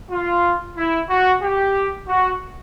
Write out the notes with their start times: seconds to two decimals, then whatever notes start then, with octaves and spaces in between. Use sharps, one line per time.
0.10 F4
0.77 E4
1.09 F#4
1.42 G4
2.08 F#4